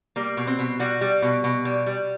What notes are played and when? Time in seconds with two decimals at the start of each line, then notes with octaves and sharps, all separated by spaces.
0.16 G3 A#3
0.37 B2
0.47 C4
0.59 B2
0.79 G3 F#4
1.01 G3
1.22 B2
1.44 B2
1.65 G3
1.86 G3